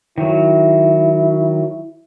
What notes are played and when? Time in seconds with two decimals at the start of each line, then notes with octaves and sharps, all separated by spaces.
0.18 D#3 F#3 E4